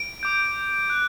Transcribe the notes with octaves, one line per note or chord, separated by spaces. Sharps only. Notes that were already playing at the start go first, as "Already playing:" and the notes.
Already playing: D7
D6 G6
F#6